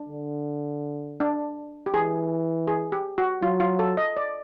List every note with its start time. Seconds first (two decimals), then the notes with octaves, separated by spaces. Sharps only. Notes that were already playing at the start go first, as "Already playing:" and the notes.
Already playing: D4
0.08 D3
1.20 D4
1.86 G4
1.94 E3 G#4
2.67 G#4
2.92 G4
3.18 F#4
3.42 F#3 F4
3.60 F4
3.79 A4
3.97 D#5
4.17 D5